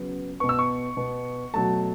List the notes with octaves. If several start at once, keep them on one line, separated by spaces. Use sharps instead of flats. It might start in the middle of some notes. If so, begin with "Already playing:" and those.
Already playing: C#3 F#3 B3
B2 B3 C#6
E6
C#6
B2 B3
B2 F#3 A3 A5